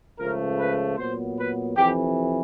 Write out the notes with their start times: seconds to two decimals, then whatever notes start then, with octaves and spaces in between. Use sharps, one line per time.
0.18 C#2 C#3 F3 A3 A#4
0.57 B4
0.97 A#2 F#3 B3 C5
1.37 B4
1.76 F2 C3 E3 G4